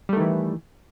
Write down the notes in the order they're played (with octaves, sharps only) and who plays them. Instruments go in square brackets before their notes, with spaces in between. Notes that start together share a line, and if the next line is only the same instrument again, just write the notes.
[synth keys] G3
A3
D#3
E3